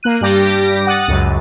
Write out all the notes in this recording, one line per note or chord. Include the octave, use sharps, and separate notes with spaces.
A#3 F#6 D#7
G2 G3 G4 D6 A#6
F#5 D#6 F#6 A6 D#7
C#2 F#2